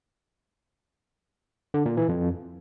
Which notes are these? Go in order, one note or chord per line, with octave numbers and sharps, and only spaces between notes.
D3
A#2
E3
F2